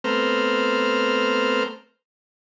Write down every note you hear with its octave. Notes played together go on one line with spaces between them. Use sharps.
A3 B3 C4 C5 A#5 F6